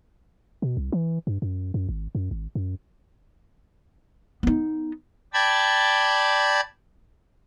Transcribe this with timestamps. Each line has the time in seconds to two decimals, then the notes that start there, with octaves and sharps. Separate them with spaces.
0.62 B2
0.77 C2
0.92 E3
1.27 G2
1.42 F#2
1.74 F#2
1.89 G#1
2.15 F#2
2.31 G#1
2.55 F#2
4.43 B3 D#4
5.34 D5 G5 A5 B5 G#6